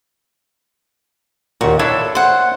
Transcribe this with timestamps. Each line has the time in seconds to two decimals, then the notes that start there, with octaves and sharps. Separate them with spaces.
1.61 D#2 A#2 F#4
1.79 D4 E4 A4 C#5
2.15 C5 F#5